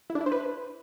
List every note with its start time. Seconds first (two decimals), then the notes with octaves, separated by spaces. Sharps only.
0.10 E4
0.15 D4
0.21 E4
0.26 C5
0.32 B4